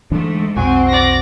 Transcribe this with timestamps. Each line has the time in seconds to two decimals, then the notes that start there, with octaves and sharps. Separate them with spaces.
0.11 D2 G#2 E3 A3 D4
0.56 B1 F2 C3 C4 F#4 G#5
0.88 D5 A#6